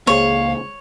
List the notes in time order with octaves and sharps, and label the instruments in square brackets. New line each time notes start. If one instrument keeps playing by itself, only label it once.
[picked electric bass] C#2 A#3 [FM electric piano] G#4 C5 [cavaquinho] C#5 [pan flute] F5